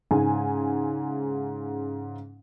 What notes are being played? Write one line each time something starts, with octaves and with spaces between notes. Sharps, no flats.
G#2 C#3 G#5